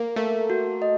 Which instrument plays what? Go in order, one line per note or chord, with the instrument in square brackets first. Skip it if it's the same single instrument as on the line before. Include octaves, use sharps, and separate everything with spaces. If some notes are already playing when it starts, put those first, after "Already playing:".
Already playing: [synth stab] A#3
[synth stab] A3 [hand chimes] A#4
[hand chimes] F#4
D#5